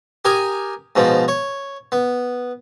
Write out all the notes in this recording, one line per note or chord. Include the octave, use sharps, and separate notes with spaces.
G4 A#4 G#5 D#6
G#2 B2 F3
C#5
B3